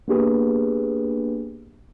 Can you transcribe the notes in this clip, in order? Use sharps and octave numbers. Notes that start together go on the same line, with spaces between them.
A#3 B3 D4 G4 G#4 B4